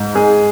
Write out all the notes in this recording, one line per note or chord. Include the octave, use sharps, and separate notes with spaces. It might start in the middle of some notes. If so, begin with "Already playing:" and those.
Already playing: G#2
G#3 G#4